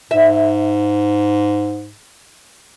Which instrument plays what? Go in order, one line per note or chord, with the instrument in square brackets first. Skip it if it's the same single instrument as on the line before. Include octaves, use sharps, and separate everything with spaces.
[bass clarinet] G#2 [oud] E5